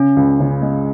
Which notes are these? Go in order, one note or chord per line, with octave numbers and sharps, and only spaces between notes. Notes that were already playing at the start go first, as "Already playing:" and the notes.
Already playing: C#3 C#4
C#2
C#3
G#3